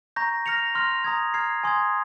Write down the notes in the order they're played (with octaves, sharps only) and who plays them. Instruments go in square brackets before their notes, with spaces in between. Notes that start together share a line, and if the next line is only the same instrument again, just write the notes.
[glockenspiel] A#5 C#6 G6 A#6
F6 A#6 C#7 F7
C6 F6 A#6 F7
A#5 D#6 G#6
A#5 F6 G#6 C7
G#5 C6 D#6 G#6